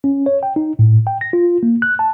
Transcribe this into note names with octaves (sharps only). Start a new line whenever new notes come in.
C#4
C#5
G5
D#4
A2
G5
A#6
F4
A#3
F#6
A5